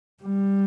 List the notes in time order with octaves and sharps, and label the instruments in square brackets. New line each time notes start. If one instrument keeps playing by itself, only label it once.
[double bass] G3